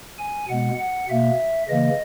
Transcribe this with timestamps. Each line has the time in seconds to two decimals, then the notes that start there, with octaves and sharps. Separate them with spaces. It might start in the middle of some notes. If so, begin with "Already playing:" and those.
0.19 G#5
0.49 B2 G#3 B3 F#5
0.79 F#5
1.09 B2 A#3 E5
1.69 C#3 E3 A#3 D#5